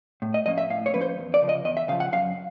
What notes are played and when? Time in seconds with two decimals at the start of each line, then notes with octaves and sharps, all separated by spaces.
0.22 A2
0.34 D#5
0.46 F3 A#3 C#4 D#5
0.58 E5
0.70 A2 F5
0.86 C#5
0.93 F3 A#3 C#4 B4
1.01 C5
1.18 E2
1.34 D5
1.42 C#3 F3
1.49 D#5
1.65 E2 D#5
1.77 E5
1.88 C#3 F5
1.92 F3
2.00 F#5
2.12 F#2 F5